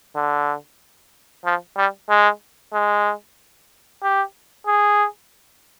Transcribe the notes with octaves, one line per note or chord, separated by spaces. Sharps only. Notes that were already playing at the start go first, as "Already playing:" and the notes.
D3
F3
G3
G#3
G#3
G4
G#4